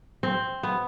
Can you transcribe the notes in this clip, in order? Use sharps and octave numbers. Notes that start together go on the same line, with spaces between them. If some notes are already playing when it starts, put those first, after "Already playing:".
C4
B3